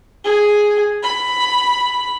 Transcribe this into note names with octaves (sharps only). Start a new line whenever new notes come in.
G#4
B5